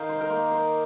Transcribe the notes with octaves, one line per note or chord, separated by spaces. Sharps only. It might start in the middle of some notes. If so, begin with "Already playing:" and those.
Already playing: D#3 D#5 F5 G5
C5
A#4
A#3 C5
C5